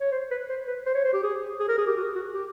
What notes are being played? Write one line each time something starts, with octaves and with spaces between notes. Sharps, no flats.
C#5
C5
B4
C5
B4
C5
C#5
C5
G4
G#4
G#4
A#4
G#4
G4
F#4
F#4
G4